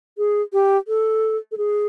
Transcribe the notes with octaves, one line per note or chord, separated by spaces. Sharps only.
G#4
G4
A4
A4
G#4